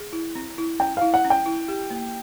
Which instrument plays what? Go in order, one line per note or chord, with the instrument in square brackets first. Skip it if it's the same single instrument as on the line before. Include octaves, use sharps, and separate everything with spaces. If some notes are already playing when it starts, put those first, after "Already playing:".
Already playing: [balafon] G#4
E4
C4
E4
[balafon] C#4 [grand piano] G5
[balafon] E4 [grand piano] F5
[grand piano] F#5
[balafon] C#4
[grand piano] G5
[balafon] E4
G4
A#3